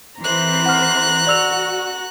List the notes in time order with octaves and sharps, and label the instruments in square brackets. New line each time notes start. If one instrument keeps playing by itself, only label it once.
[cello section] E3 C4 C5 [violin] A#5 F#6
[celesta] F#5 F6
[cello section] F#4 [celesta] D5 E6 F7